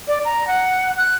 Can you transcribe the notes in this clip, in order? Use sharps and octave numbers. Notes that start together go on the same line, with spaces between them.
D5
A#5
F#5
F#6